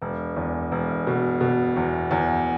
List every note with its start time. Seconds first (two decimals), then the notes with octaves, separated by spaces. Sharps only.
0.02 E1
0.36 E2
0.72 E1
1.07 B2
1.41 B2
1.76 E2
2.11 E2